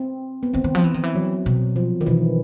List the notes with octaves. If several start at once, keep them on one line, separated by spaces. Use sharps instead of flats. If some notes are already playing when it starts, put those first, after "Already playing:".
Already playing: C4
B3
D#3 C4
D#3
F3
E3
D#3
E3
F#3
B2
F3
D#3
B2 E3